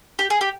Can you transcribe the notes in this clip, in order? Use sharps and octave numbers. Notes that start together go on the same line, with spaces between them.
G4
G#4
G4